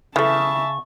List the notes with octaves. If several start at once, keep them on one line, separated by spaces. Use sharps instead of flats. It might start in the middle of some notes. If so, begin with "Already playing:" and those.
C#3 E3 A3 E5 A5 C#6